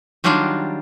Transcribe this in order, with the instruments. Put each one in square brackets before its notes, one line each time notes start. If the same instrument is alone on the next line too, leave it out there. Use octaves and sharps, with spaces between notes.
[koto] D#3 F#3 G3 D4 F4